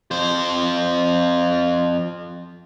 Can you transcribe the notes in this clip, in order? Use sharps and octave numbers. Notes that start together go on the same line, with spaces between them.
F2 C5